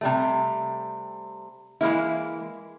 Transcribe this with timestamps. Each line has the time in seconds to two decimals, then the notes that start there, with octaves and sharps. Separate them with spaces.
0.01 C3 G3 A3
1.81 E3 G#3 A#3 E4